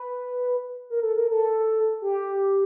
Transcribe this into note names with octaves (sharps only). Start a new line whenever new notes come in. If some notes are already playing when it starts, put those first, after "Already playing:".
Already playing: B4
A#4
A4
A#4
A4
G4